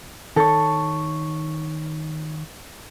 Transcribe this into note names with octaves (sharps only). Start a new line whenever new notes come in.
D#3 A4 C#5